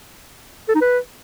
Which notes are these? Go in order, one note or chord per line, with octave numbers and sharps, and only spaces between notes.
A4
D#4
B4